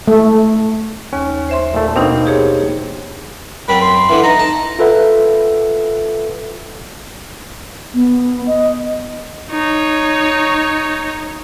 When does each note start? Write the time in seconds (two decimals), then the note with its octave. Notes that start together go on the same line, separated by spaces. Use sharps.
0.08 A3
1.13 D#2 C#4
1.49 C5 E5 C6
1.74 A#2 A3
1.96 B2 A#3 C4 D4 D#4
2.26 G4 G#4 C#5
3.69 F#2 C4 B5
3.81 C6
4.09 D3 E3
4.24 D#4 A#5
4.39 A5
4.79 F4 A4 B4 E5 F#5
7.94 B3
8.47 D#5
9.50 D#4 C#5